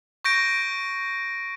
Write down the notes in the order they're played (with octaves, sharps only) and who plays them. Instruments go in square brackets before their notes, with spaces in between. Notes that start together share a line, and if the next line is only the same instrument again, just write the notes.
[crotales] C#6 G6 A#6 D7